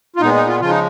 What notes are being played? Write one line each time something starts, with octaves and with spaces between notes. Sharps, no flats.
F4
A#2 G#3 B3 D#4
D#4
F4
C#3 F3 G#3 F4
D#4